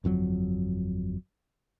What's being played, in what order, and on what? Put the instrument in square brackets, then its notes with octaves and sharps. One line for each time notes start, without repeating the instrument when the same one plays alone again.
[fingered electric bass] G1 F2 D3 F#3